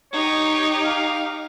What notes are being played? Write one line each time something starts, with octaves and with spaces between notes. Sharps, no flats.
D#4 G4 C#5
F5